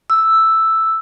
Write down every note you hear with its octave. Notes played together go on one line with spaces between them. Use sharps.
E6